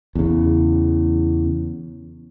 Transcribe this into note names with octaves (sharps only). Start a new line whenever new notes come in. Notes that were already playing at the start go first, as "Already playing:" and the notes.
E2 C#3